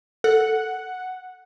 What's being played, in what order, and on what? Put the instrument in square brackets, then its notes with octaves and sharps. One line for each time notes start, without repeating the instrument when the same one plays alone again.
[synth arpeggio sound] A4 [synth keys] F#5